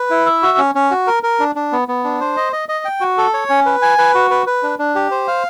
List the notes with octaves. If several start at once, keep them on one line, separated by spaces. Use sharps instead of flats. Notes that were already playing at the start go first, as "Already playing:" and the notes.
Already playing: B4
E4
E5
F#4
C#4
C#4
F#4
A#4
A#4
D4
D4
B3
B3
D4
C5
D#5
D#5
D#5
G5
F#4
A4
C#5
C#4
B4
G#5
B4
F#4
B4
B4
D4
D4
G4
C5
F5